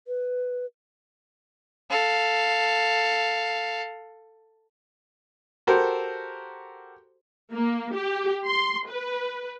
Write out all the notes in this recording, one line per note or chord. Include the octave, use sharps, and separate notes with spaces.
B4
A4 F5
F#4 G4 A4 A#4 C5
A#3
G4
C6
B4